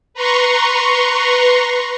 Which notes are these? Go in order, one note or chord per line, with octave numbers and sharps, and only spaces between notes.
B4 A#5 C6 C#6